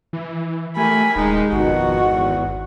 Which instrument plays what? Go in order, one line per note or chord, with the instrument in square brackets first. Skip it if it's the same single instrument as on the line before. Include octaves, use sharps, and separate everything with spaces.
[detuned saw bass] E3
[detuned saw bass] A3 [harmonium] G4 A#4 [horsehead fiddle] G#5 B5
[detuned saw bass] D#1 [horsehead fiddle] G#3 D#4
[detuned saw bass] G#1 [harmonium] F2 B2 D#3 [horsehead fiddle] F#4
[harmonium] E2